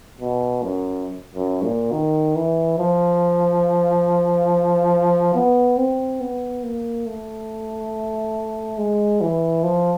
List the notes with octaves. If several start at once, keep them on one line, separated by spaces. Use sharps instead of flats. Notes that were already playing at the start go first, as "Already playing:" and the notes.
B2
F#2
F#2
A#2
D#3
E3
F3
B3
C4
B3
A#3
A3
G#3
E3
F3